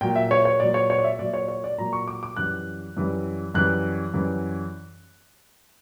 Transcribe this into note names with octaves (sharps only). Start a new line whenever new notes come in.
A#2 F#3 G5
E5
C#5
C#5
A#2 F#3 D5
C#5
C#5
D5
E5
A#2 F#3 D5
C#5
C#5
D5
A#2 F#3 A#5
C#6
D6
D6
F#2 E3 G3 F#6
F#2 E3 G3
F#2 E3 G3 F#6
F#2 E3 G3